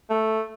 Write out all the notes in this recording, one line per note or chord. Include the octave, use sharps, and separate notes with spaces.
A3